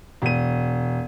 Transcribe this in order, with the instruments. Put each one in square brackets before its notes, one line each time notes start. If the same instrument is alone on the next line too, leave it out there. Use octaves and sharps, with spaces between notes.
[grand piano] E1 D#7